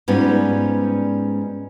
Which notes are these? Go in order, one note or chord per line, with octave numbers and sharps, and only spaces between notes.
G#2 G3 B3 C#4 F4 D5